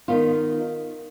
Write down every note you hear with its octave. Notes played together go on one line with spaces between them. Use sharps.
D#3 B3 F4